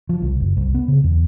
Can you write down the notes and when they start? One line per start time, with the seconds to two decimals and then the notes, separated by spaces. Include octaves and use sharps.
0.09 F3
0.22 C2
0.40 F#1
0.57 C2
0.75 B3
0.88 C#3
1.04 E2